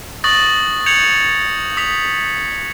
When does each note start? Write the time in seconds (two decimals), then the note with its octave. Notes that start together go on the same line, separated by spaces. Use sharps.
0.24 C#6 D#6 F#6 A6 A#6 F#7
0.86 G6 G#6 C#7 F7 F#7
1.77 D#6 B6 F7